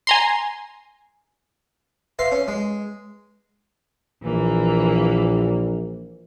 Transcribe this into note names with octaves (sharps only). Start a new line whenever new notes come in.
G#5 A#5 C6
B4 E5 F5 C6
C#4
G#3
A#1 E3 A#3